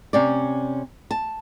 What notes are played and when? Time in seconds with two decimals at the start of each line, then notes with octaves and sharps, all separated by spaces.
0.13 C3 C#4 D5
1.11 A5